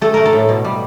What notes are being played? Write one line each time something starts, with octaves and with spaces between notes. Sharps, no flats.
A3 A4
A3 A#4
A4
A2
B2
G3